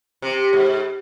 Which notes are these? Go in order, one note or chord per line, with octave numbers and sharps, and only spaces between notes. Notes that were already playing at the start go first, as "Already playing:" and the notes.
C3
G#2